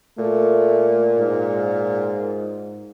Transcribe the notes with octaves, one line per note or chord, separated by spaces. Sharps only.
A#2 A3
G#2